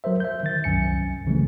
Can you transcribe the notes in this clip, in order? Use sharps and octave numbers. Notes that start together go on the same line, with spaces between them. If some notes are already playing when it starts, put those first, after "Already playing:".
F#3 A#4 C5 E5
E5 G6
D#3 A6
C2 F#2 G#5 C#7
C#3 E3 F3 G3 A3